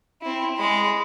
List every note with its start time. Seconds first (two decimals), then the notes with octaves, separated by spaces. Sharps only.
0.22 C4 E4
0.57 G#3 B5